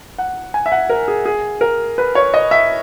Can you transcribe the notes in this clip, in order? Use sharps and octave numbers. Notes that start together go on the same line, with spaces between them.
F#5
G#5
E5
F#5
A#4
G#4
G#4
A#4
B4
C#5
D#5
E5